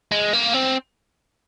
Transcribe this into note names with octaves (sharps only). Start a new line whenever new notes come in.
G#3
A#3
C4